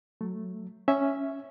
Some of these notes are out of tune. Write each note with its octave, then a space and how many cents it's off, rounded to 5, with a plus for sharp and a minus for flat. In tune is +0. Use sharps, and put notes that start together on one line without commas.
F#3 -5 A3 +0
C#4 +0 E5 +0